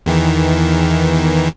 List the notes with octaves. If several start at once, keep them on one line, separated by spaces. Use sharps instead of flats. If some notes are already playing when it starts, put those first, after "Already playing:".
E2 D#3 E3